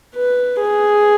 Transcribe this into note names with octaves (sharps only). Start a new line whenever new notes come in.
B4
G#4